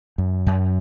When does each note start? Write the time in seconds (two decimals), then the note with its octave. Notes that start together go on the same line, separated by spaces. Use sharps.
0.18 F#2
0.46 F#2